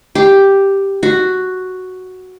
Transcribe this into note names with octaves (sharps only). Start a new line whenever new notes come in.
G4
F#4